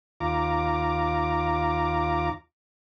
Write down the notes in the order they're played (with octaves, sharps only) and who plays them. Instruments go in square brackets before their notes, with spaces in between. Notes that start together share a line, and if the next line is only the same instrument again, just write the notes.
[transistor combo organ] D#2 F4 A#5 D6